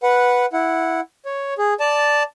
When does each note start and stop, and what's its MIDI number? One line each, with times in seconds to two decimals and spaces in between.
0.03 0.46 71
0.03 0.46 78
0.53 1.00 64
0.53 1.00 78
1.25 1.54 73
1.58 1.74 68
1.80 2.23 74
1.80 2.23 81